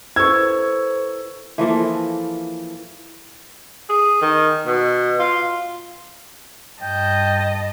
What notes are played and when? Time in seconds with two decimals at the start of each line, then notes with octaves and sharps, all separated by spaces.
0.16 E4 A4 B4 C5 C#6 E6 G#6
1.58 E3 F3 A#3 A4
3.89 G#4
4.22 D#3
4.67 B2
5.19 F4
6.82 G2 D#5 G5 A5